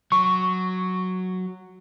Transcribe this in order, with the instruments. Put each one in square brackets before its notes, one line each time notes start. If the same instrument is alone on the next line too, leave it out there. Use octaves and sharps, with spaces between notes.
[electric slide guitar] F#3 [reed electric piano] C#6